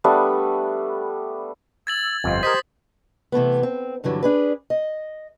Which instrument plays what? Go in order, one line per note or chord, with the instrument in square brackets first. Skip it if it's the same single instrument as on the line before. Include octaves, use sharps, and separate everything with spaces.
[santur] G3 A3 B3 D4
[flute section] E6 [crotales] G#6 A6 F#7
[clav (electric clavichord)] G1 F2 [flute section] F4 C5 D#5
[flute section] G4 G#6 [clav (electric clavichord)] A#4 D#5 [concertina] C5 [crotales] D#6 B6
[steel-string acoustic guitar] C3 E3 A3 B3
C4
G2 D3 E3 F#3 G3
D4 G#4 B4
D#5